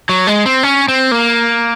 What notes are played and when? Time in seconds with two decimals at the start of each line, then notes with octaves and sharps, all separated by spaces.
0.09 F#3
0.27 G#3
0.46 C4
0.63 C#4
0.88 C4
1.11 A#3